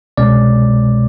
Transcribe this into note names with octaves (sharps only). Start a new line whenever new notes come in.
C2 B2 G#3 C#4 D5